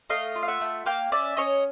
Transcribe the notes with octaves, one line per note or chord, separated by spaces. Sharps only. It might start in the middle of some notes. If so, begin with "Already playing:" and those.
A3 D#5 F5
F4
F5
E5 F#5
A3
A#3 F5 G5
C#4 D5 E5
C#4 C#5 D#5